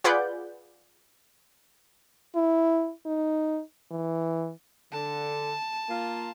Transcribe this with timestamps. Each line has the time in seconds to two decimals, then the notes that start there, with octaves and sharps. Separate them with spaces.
0.04 F4 G#4 B4 D5 F#5 G6
2.35 E4
3.05 D#4
3.91 E3
4.92 D3 A5
5.89 A#3 F4